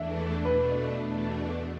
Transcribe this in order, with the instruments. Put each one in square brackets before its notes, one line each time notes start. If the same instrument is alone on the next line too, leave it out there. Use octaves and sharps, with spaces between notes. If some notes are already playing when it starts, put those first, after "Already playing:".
Already playing: [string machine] E2 E3 A3 D4 [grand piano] E5
[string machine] B2 A3 D4 [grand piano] B4
[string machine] E2 B2 A3 D4